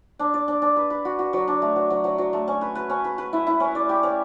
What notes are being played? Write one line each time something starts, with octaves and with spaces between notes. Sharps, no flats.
D4
D5
D4
D4
B4
B4
F#4
F#4
F#3
D4
A3
F#3
F#3
F#3
F#3
A3
C#4
B4
B4
C#4
B4
B4
E4
E4
C#4
D5
G4
C#4